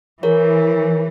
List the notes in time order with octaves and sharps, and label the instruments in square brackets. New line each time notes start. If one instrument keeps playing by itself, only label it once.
[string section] E3 [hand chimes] G#4 A#4 C#5